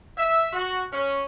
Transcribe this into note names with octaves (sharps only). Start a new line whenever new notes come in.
E5
F#4
C#4